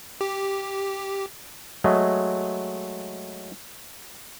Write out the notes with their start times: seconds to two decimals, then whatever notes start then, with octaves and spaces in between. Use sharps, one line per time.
0.21 G4
1.84 F#3 G#3 A3 D#5